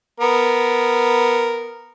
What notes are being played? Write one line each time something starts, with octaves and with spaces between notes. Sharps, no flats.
B3 A#4